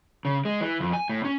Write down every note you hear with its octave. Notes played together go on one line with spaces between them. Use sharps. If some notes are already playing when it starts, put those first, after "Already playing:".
C#3
G#3
E3
F2
G#5
A2
C#4